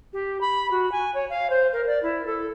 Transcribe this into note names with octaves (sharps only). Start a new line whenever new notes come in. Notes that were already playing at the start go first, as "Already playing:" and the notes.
G4
B5
F#4
G#5
C#5
F5
C5
A#4
D5
E4
A4